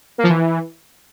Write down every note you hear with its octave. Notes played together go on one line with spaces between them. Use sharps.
A#3
F3
E3